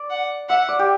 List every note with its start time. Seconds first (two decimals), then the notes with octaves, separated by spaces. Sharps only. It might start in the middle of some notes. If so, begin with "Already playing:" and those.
Already playing: D5
0.10 F#5
0.49 E5 F#5
0.69 D5
0.79 G4